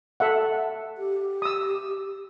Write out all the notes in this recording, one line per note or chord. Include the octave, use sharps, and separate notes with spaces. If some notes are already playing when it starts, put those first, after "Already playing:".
A4 E5 F#5
G4
D#6 E6